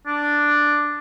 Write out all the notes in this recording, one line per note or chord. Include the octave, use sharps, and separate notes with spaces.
D4